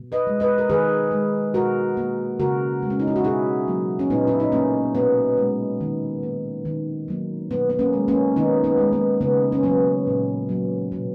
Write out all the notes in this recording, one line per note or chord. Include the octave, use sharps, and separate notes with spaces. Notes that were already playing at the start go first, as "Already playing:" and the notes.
Already playing: B2
B4 D#5
G#3
B4 D#5
A#4
D#3 G#4 B4
G#3
B2 F#4 A#4
A#3
C#3 F#4 A#4
G#3
C#4
D#4
E4
F#4
B2 E4 G#4
F#3 A#3
C#4
A#2 B3 D#4
E4
D#4
A#3 C#4
B2 B3
G#3
D#3
A#3
D#3
F#3 A#3
B2 B3
B3
A#3 C#4
G#3
A#3 C#4
D#3 B3 D#4
B3
G#3
A#3
C#3 B3
C#4
F#3 A#3 B3
A#2
F#3 A#3
B2